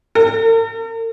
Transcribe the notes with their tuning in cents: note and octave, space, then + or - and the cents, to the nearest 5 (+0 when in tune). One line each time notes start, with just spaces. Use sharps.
A#4 -45